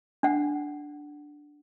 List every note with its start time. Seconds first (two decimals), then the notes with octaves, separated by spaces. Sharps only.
0.23 D4 F#5